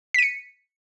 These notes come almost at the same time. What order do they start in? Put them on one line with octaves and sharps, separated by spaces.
B6 D#7 C#7